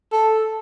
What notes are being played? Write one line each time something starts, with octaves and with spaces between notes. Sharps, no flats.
A4